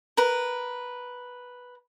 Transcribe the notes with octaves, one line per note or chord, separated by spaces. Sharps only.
A#4 B4